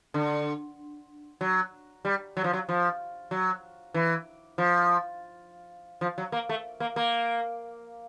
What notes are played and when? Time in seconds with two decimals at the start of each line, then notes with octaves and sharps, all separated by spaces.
0.14 D3
1.41 F#3
2.05 G3
2.37 F#3
2.44 F3
2.53 F#3
2.69 F3
3.31 F#3
3.94 E3
4.58 F3
6.01 F3
6.18 F#3
6.32 A#3
6.49 A3
6.80 A#3
6.96 A#3